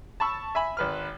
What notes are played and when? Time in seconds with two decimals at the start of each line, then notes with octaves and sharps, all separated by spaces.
0.20 A5 B5 C#6 E6
0.55 E5 G#5 B5
0.77 G#1 B4 F6